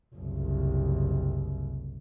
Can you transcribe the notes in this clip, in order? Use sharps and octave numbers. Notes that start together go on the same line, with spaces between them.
F#1 C2